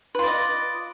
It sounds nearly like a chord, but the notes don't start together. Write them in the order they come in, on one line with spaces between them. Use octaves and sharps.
B4 F4 D5 D#5